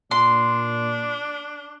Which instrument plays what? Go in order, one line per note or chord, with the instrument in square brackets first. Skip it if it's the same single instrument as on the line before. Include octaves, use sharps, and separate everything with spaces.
[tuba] A#2 [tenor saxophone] D4 [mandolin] C6